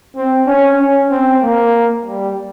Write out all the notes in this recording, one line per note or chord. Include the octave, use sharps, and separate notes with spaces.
C4
C#4
C#4
C4
A#3
G3